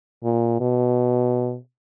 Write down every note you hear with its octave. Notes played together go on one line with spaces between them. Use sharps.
A#2
B2